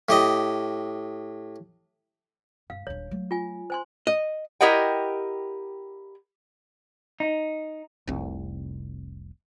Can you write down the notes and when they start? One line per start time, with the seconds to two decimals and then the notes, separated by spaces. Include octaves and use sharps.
0.09 A2 G4 D#5
2.70 G2 F5
2.87 D#1 D4 C#5
3.11 F#3 A3
3.31 F4 G#5
3.70 C5 G#5 C6
4.07 D#5
4.61 E4 G4 A#4 D#5 F#5 G5
7.20 D#4
8.08 F1 C2